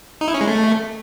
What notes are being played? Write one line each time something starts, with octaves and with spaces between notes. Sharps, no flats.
D#4
E4
C#4
G#3
A3